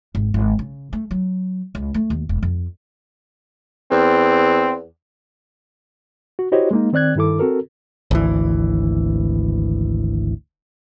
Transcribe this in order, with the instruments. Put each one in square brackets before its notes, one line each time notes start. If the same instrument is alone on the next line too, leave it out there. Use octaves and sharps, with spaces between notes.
[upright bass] G#1
G#1
C#3
A3
F#3
C#2
A3
D#2
E1
F2
[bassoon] E2 [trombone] C4
[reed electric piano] F#4
E4 F#4 G4 C5 C#5 D#5
G#3 A#3 D#4
D#3 C4 D5 F#6 G#6
G2 D#3 E4 A4 D6
C4 F#4 A4 A#4
[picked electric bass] G#1 D2 E3